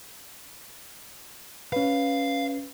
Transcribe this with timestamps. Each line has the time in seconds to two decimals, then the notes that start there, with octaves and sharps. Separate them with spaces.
1.73 C#4 B4 F5